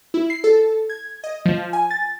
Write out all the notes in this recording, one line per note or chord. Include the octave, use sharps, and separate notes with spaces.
E4
C7
A4
G#6
D#5
F3
G#5
A6